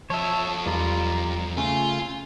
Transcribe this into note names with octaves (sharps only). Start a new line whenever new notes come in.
F2 C#5 D#5 E5 A5
E2 G3 F4 A#5
C#3 A3 F4 G#5